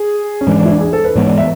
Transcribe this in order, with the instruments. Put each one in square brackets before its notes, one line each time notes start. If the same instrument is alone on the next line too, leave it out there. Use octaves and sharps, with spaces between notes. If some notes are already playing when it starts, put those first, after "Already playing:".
Already playing: [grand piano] G#4
C#4
[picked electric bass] G#2 E3 G#3 [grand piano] D4
[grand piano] D4
E4
D4
G#4
A4
B4
[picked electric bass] G#2 E3 G#3 B3 [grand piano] C#5
[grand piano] D5
E5